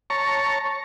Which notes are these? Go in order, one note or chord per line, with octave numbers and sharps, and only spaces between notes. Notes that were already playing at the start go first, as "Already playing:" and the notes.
C#5 A5 A#5 C#6